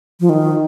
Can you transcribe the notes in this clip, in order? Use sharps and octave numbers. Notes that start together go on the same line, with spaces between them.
F3
D#3